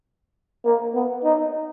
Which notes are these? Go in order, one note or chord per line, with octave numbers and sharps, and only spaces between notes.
A#3
B3
D#4